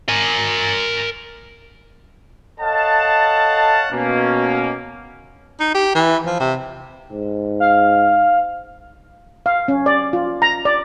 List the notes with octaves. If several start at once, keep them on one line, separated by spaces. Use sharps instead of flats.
A#4 G#5
A4 C#5 D#5 F5 F#5 A5
B2 A#3 C#4
D#4
G4
E3
F3
C3
G#2
F5
F5
C#4
D5
F4
A#5
D5